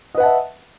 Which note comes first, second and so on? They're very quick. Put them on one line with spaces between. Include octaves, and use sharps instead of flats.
D#5 B4 F#5 A5 E5